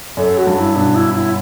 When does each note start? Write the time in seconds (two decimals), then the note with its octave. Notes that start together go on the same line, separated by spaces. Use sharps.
0.17 F#2 A4
0.38 F#4
0.47 G2
0.57 E4
0.76 B2 D4
0.95 E4
1.14 E4